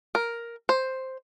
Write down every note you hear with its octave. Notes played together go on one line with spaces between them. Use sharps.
A#4
C5